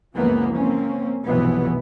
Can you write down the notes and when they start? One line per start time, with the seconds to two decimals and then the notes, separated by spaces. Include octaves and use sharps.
0.16 C#2 F#2 E3 F3 A#3 B3
0.55 A#3 C4 C#4
1.26 F1 B1 G2 E3 B3